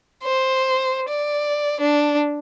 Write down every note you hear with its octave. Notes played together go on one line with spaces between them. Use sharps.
C5
D5
D4